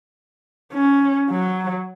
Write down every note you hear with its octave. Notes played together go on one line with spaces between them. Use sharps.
C#4
F#3